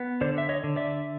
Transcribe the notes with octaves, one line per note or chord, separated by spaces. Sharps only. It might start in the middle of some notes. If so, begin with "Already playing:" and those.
Already playing: B3
D3 C5 D5
E5
C#5 D#5
D3
D5 E5